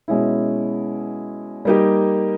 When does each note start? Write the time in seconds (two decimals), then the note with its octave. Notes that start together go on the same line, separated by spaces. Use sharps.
0.08 B2 G#3 C#4 E4
1.65 G3 A#3 D#4 G4